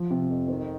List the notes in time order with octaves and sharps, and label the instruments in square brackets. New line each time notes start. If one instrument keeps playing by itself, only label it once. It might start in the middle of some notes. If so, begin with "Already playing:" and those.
Already playing: [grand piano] F3
C3
F2
[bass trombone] D#3 [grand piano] C4